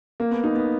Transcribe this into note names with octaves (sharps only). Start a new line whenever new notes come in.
A#3
B3
D#4
B3